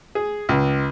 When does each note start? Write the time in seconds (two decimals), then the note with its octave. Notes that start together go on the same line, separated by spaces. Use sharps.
0.15 G#4
0.49 C#2